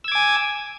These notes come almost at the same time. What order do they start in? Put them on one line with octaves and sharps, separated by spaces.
E6 G#6 D6 G#5